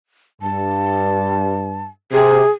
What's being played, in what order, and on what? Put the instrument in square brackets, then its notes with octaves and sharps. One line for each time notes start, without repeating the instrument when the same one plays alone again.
[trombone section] G2 [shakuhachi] A5
[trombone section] C3 [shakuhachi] G#4